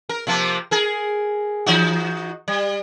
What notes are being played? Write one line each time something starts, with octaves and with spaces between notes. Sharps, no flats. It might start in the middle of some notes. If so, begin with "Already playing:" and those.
A#4
C3 F3 A#3
G#4 A#4
E3 D#4 F#4
G3